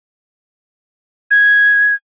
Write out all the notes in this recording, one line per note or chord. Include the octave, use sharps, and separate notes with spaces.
G#6